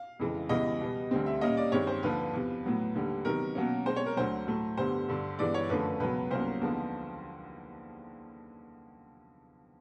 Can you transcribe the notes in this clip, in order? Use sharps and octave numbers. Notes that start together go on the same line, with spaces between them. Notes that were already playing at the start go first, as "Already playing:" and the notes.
Already playing: F5
F2 C#3 E3 G#3
C#2 C#3 E3 G3 B3 D#5
B2 G3 B3
D2 D3 G3 C4
E5
A#2 G3 A#3 C#4 D#5
D5
G2 D#3 G#3 C4 C#5
C5
D#2 D3 F3 B4
E2 C3 F3
A2 F#3 B3
D#2 D3 G3
C3 D#3 F#3 B3 A#4
B2 F#3 A#3 C#4
B2 G#3 C4 C5
C#5
A#4
D2 D3 F#3 C5
A2 F#3 A3
G2 D3 G3 B3 C5
G2 D3 G3
G2 E3 G#3 B3 D5
C#5
F#2 D3 F3 A3 B4
C#2 B2 F#3 B4
C2 B2 F#3 A#3 C#4 C5
D#2 D3 F3 G#3 B3